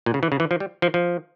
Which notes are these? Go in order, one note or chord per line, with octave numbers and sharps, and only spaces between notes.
A#2
C#3
E3
C#3
E3
F3
G3
F3
F3